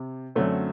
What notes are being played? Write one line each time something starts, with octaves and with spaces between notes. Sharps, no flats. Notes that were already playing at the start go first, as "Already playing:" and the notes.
Already playing: C3
F#2 D3 F#3 A3 C4